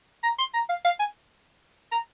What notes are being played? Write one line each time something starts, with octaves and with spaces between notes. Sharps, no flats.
A#5
C6
A#5
F5
F5
G#5
A#5